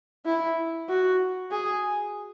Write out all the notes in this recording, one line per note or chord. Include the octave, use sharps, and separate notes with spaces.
E4
F#4
G#4